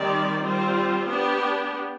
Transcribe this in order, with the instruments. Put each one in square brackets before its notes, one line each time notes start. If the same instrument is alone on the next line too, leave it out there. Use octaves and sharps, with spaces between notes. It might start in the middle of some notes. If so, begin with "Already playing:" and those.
Already playing: [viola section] D#3 G3 C4 G4 D5
G3 C4 F4 C5
B3 D4 G4